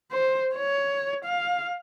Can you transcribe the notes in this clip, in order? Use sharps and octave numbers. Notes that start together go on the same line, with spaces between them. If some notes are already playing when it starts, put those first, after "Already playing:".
C5
C#5
F5